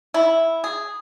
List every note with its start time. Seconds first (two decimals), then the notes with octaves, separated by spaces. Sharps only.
0.14 E4
0.64 G#4